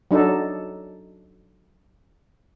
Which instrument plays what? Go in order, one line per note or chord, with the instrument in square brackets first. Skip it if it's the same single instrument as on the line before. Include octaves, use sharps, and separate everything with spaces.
[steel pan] F#3 D4 D#4 A4